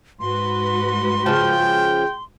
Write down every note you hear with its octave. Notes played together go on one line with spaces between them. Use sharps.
G#2 F#4 B4 C6
C#3 F3 G5